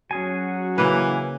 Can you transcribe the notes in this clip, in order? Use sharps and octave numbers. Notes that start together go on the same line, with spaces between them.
F#3 C#4 F#4 G#4 G#5
C#3 E3 A#3 B4